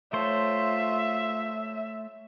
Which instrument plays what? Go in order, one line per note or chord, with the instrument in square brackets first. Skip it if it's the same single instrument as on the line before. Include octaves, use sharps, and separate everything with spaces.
[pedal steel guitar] A3 C5 [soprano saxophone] F4 [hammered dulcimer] C#5 A5 [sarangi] E5